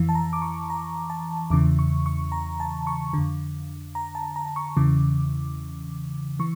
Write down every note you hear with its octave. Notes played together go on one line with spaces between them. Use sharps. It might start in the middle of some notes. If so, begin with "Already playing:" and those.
Already playing: F2 E3
A5
A#5
D6
C#6
A#5
A5
E2 C#3 E3 D6
C#6
C#6
A#5
A5
C#6
F2 D3
A#5
A5
A#5
C#6
E2 C#3 E3 D6
E3 C#6